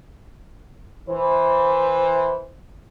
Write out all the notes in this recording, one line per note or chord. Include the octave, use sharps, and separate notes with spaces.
E3 C5